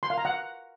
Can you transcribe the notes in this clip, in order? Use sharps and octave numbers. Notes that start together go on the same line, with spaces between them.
C6
F5
A#5
F#5